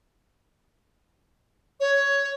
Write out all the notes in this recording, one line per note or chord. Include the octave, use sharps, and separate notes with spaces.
C#5